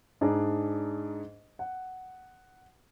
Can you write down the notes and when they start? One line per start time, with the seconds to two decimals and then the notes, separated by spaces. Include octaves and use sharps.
0.21 G#2 D4 G#4 D5 A#5
1.59 F#5